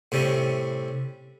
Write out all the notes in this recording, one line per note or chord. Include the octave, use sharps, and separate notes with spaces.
A2 C3 G3 C#4